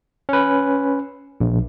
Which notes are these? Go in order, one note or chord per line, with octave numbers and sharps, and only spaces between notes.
C#4 B4
A#1